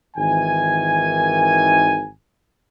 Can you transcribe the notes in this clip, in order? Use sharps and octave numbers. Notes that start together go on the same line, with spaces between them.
G#1 D#3 E3 G#5